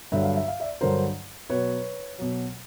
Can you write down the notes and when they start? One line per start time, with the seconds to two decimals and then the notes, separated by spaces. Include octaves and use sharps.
0.12 G2 D3 F#3 E5
0.24 F5
0.36 E5
0.48 F5
0.60 D5 E5
0.81 G2 D3 F#3 A#4 C5
1.50 B2 F#3 B4 C#5
2.18 B2 F#3